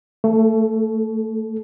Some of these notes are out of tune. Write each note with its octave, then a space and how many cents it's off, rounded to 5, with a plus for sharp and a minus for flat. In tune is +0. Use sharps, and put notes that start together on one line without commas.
A3 +25 A4 -20